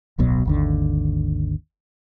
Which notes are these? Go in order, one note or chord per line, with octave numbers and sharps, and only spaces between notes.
D1 B1 B2 F#3
G#1 D#2 D3